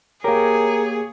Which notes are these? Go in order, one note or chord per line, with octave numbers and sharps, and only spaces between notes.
A#3 G4 G#4 A#4 C#5